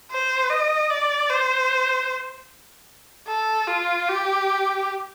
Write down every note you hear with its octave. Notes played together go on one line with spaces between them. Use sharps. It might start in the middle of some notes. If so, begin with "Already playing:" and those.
C5
D#5
D5
C5
A4
F4
G4